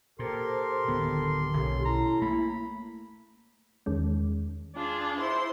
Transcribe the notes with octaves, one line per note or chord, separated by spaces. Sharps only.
A#2 G4 A4 A#4 C5 C6
D1 D3 D#3 B3
B1 A#2 D#3 C#4 G4 A4
E4 A#5
A3 A#3 B5
E2 D#3 G#3 C#4
D4 F4 G#4
E4 C5 C6